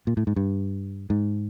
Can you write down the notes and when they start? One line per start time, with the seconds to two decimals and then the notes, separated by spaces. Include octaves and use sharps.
0.07 A#2
0.17 A2
0.27 G#2
0.36 G2
1.10 G#2